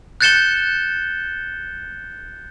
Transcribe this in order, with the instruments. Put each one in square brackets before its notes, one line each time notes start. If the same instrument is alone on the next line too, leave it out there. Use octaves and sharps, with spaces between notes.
[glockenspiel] F#6 G6 A6 C#7 E7 G7